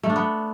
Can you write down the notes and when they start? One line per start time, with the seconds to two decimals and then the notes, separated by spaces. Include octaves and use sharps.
0.03 A3
0.10 D4
0.16 B3